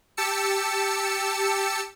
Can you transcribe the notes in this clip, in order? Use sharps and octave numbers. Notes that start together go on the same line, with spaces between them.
G4 A5 E6 C#7